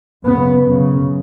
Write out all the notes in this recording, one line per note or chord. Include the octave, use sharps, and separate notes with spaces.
F#2 C#3 B3
F#2 C#3